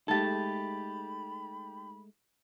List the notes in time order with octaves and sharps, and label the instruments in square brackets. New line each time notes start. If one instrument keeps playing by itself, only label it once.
[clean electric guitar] G#3 A3 A4 [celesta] D#4 A6 [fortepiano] G4 A5 [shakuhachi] B5